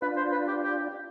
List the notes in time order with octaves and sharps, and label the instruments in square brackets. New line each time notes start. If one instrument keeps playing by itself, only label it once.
[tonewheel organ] D4 F4 [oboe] B4
[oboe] C5
B4
G4
G4